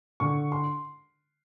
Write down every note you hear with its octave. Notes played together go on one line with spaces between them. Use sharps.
D3 C#6
C6